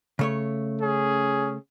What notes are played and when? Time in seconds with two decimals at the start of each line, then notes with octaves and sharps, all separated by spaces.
0.19 C#3 A3 C#5
0.81 C#4 G#4